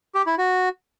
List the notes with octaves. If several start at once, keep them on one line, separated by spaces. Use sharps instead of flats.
G4
E4
F#4